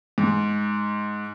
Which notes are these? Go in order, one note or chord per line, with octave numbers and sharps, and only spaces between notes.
G#2